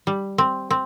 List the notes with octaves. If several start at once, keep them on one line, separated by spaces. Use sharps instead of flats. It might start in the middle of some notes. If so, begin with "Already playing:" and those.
G3
C4
C4